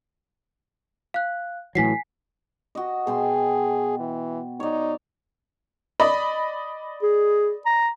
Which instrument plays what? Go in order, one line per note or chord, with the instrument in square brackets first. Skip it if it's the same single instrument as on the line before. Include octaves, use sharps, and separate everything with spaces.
[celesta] F5 F#6
[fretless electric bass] A2 E3 F#3 [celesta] G#5 B6 C7
[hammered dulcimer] F#4 D#5
[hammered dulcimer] B2 G5 C6 [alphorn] G#4
[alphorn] E3
[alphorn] D#4 [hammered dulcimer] C#5 D5
[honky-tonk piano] D5 D#5 B5
[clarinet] G#4
A#5